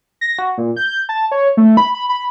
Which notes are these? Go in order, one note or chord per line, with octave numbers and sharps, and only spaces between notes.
A#6
F#4
A#2
G6
A5
C#5
A3
B5
B5
B5